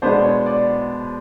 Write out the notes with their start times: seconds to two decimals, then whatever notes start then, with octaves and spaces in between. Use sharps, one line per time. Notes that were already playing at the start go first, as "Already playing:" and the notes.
0.02 B2 G#3 B3 D4 C5
0.24 C#5
0.46 D5